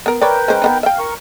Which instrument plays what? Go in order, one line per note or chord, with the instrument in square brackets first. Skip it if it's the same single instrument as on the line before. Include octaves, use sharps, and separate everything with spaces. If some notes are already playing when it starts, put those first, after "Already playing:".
[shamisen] B3 A#4
[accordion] A#4 B4 G5 [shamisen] C#5 D5
[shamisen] G#3 C#4 C5
B3 D4 D#4
[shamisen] E5 G5 [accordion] F5
[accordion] A#4 C#6